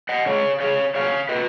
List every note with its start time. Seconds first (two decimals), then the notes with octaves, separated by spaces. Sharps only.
0.09 D#5 F#5
0.26 C#3 G#3 C#5 F5
0.60 C#3 G#3 C#5 F5
0.95 A#2 F#3 C#5 F5
1.29 A#2 B4 D#5